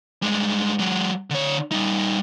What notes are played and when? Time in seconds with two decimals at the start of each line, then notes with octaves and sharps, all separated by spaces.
0.22 G2 G#3
0.79 F#3 G#3
1.30 D3 C#5
1.72 G3 D#4